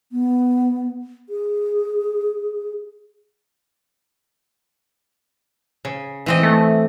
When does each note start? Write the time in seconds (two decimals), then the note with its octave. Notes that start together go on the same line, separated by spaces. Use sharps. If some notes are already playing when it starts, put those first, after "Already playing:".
0.12 B3
1.29 G#4
5.85 C#3
6.26 E3 C4 D#5
6.43 A3